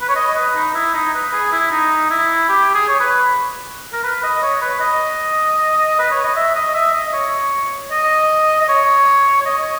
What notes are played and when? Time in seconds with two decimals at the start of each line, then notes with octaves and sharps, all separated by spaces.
0.02 B4
0.09 C#5
0.16 D#5
0.36 B4
0.55 D#4
0.75 E4
0.94 D#4
1.14 B4
1.33 G#4
1.52 E4
1.71 D#4
2.10 E4
2.49 G4
2.75 G#4
2.89 C#5
3.00 B4
3.93 A#4
4.04 B4
4.23 D#5
4.43 C#5
4.62 B4
4.80 D#5
5.99 B4
6.11 C#5
6.24 D#5
6.36 E5
6.55 D#5
6.74 E5
6.94 D#5
7.13 C#5
7.91 D#5
8.62 D#5
8.69 C#5
9.41 C#5
9.46 D#5